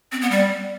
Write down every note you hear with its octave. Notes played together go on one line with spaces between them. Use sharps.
C4
B3
G3